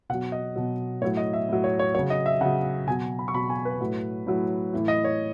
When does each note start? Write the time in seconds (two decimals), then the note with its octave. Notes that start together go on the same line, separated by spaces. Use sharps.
0.09 B2 F#5
0.14 F#3
0.32 D#5
0.56 B2 F#3
1.02 A2 C#5
1.05 F#3
1.17 D#5
1.33 E5
1.49 A2 F#3
1.64 C#5
1.79 C#5
1.94 F#3 C#5
1.99 C#3
2.10 D#5
2.26 E5
2.41 C#3 F#3 F#5
2.87 B2 G#5
2.90 F#3
3.19 B5
3.28 C#6
3.34 B2 F#3 B5
3.50 G#5
3.65 B4
3.81 A2 F#3
4.27 A2 F#3
4.74 A2 E3
4.88 D#5
5.04 C#5